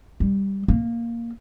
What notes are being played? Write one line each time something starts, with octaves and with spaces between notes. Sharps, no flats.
G3
A#3